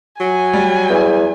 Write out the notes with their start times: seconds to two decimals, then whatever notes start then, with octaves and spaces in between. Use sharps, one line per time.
0.20 F#3 G#5
0.53 G3
0.90 E2